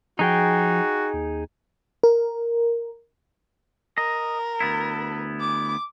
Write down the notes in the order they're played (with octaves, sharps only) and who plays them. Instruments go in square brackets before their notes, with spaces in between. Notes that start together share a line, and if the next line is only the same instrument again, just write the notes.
[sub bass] F3 [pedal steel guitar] D#4 G#4 G5 [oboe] F#4
[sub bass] D#2
[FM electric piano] A#4
[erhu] A#4 [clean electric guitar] D#5
[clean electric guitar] D2 B3 E4
[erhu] D6